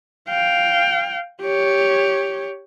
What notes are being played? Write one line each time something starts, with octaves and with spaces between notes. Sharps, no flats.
F5 G5
G4 C#5